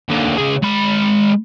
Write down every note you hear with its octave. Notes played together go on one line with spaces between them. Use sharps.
D#2 D3
C#2 G#4
G#3 B5